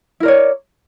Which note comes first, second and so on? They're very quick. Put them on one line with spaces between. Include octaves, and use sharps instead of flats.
E4 A#4 D5 C#5